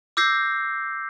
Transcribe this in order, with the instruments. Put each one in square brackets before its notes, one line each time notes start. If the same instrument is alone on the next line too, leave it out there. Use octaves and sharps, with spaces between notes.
[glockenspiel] D6 E6 G6 A#6 C7